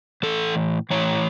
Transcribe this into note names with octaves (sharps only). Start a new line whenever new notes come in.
A2 E3 A4
A2 E3 C#5